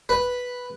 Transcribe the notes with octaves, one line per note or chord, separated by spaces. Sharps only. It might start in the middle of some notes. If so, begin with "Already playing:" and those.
B4